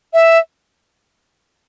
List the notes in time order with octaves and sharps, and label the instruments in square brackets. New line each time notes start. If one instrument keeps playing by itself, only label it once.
[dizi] E5